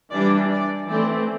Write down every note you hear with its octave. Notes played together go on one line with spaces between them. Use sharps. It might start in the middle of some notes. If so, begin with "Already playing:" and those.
E3 G3 D4 D5
D5
E3 A3 C4 D5